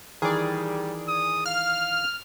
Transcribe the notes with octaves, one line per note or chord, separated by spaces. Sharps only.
D#3 E3 G3 G#4 D5
D#6
F5 F6